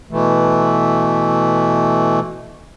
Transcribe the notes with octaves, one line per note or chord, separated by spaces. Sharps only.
B2 E3 A3